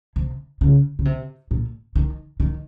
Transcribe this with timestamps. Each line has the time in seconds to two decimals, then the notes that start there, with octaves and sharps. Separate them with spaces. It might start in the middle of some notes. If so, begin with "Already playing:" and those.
0.16 C3
0.61 C#3
0.99 C#3
1.05 C3
1.51 A#2
1.96 D#3
2.40 D#3